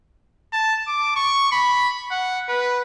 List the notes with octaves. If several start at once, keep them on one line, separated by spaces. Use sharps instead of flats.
A5
D6
C#6
B5
F#5
B4